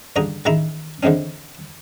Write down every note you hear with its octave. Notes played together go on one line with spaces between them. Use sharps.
C#2 G2 D3 A#5 D#6
A1 D#3 G#3 E4 A#5 B5
D3 E3 G#3 C4 C#4